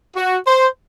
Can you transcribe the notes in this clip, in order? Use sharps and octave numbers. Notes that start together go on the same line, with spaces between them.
F#4
C5